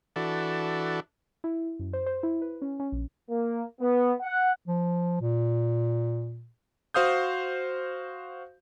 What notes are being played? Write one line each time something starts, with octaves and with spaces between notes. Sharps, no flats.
E3 D4 F#4 A4
E4
F#2
C5
C5
E4
B4
C#4
C#4
A#1
A#3
B3
F#5
F3
A#2
F#4 C5 F5 D#6 G6